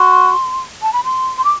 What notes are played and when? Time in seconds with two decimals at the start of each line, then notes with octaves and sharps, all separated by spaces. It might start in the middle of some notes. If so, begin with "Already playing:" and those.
Already playing: F#4 C6
0.82 A5
0.93 B5
1.04 C6
1.38 C6
1.44 D6